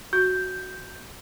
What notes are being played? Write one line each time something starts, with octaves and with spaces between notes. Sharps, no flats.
F#4 G6